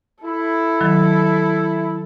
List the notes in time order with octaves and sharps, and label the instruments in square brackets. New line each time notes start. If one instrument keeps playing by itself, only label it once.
[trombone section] E4 [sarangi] A4
[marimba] D#3 F#3